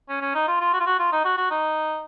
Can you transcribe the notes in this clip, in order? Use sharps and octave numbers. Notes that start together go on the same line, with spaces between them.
C#4
C#4
D#4
F4
F4
F#4
F4
F#4
F4
D#4
F#4
F#4
D#4